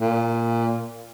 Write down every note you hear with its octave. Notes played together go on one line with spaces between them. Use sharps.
A#2